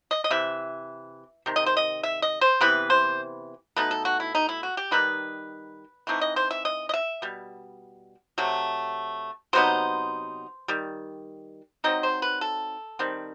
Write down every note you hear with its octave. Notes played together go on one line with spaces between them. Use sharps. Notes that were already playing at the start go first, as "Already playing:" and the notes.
D#5
D#5
C3 E3 E5
C3 D#3
D#5
C5
D#5
E5
D#5
C5
C3 E3 B3 B4
C5
B2 A3 D#4 B4
A4
F#4
E4
D#4
E4
F#4
G4
D#3 G3 D#4 B4
E3 A3 C4 D#4
D#5
C5
E5
D#5
D#5
E5
B2 G3
C3 F#3 A3
C3 F#3 B3 D#4 C5
D#3 G3
F#3 C4 D#4 D#5
C5
B4
A4
D#3 G3 C4